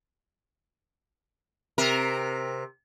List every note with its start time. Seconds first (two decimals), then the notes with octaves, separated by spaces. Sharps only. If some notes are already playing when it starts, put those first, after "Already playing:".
1.78 C3 A#4